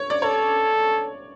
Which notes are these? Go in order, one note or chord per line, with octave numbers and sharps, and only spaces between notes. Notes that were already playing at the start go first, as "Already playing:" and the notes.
Already playing: C#5
D5
A4 C#5